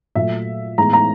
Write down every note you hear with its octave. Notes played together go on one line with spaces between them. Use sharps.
A#2 F#3 A3 E5
A2 E3 G#3 B3 A#5
A#5